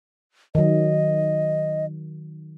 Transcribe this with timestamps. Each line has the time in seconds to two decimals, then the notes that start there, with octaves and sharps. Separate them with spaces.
0.55 D#3 F#3 D#5